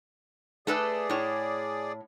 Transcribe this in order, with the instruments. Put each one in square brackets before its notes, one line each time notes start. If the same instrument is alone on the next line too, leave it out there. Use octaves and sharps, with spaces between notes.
[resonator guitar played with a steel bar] A3 A4 B4 [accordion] G#4 D5
[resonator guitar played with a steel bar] A2 C#5